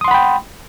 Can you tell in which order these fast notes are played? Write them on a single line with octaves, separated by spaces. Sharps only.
D#6 C6 F#5 B5 G5